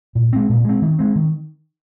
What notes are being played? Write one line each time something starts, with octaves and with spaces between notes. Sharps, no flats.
A#2
G#3 C4
A#2
G#3 C4
D#3
G#3 C4
D#3